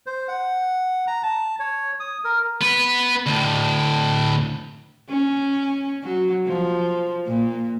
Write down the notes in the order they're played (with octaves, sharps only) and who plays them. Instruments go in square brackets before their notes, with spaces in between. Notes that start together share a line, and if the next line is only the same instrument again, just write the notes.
[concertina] C5
F#5
A#5
A5
C#5
D#6
A#4
[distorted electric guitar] B3 B4
D2 A2
[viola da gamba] C#4
F#3
F3
A#2